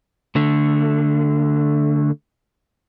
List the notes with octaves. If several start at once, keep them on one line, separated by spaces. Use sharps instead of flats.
D3 A3